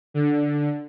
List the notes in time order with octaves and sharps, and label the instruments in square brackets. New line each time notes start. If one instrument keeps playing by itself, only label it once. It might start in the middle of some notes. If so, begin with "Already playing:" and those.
[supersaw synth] D3